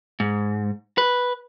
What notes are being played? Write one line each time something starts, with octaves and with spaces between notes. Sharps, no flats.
G#2
B4